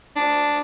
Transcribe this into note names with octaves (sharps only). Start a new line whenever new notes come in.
D4